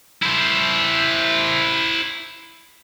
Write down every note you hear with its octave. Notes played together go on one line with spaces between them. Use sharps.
E4 C5